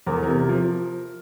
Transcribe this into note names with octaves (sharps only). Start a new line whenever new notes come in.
E2 A#4
A4
C3 A#4
F3